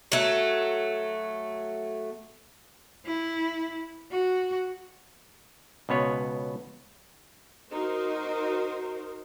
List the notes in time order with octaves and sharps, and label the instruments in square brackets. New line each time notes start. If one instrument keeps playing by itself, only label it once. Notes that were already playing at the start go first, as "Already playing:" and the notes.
[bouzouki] F#3 A3
[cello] E4
F#4
[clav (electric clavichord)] C#2 B2 B3 C#5
[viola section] D#4 F#4 A#4 C5